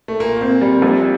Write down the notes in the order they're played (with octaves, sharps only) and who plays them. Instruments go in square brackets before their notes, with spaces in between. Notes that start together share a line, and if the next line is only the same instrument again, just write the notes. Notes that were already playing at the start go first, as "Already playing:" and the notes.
[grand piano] A3
[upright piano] A#2 [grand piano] A#3
[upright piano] C4
G3
A#1